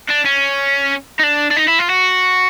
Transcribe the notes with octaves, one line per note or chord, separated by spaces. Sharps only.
D4
C#4
D#4
D4
D4
D#4
E4
F4
F#4